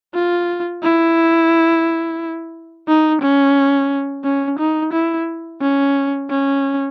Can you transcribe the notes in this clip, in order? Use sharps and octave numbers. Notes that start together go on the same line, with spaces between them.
F4
E4
D#4
C#4
C#4
D#4
E4
C#4
C#4